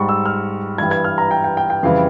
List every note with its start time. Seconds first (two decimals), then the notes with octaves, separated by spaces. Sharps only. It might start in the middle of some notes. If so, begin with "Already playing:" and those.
Already playing: G#2 G3 C#6
0.09 E6
0.26 F6
0.78 G2 E3 G3 G#6
0.91 G#6
1.04 F6
1.18 A#5
1.31 G5
1.44 G5
1.57 G5
1.70 G5
1.83 F2 C#3 E3 G3 F5